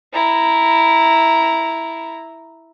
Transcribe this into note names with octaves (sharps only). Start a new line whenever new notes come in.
E4 A#5